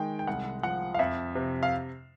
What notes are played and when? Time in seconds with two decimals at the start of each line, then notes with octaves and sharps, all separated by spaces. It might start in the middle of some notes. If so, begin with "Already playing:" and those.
Already playing: D#3 G#3 G5
0.19 G5
0.27 C2 F#5
0.63 F3 F#5
0.94 F5
0.99 F2 E5
1.35 C3
1.63 F5